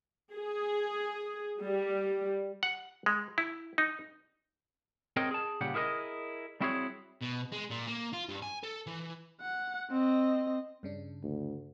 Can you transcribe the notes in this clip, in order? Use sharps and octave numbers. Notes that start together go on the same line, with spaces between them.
G#4
G3
F#5
G#3
E4
D#4
C4 G#4 A#4 C#5 D#5 G5
G#4 A5
A#2 C#3 G3 G4 F#5
E4 G#4 A#4 B4 D#5
G3 C4 E4 F#4 G#4 C#5
B2
G#3
A#2
A#3
F4
G2
G#5
A4
E3
F#5
C4 D#5
G2 C#3 D4
D2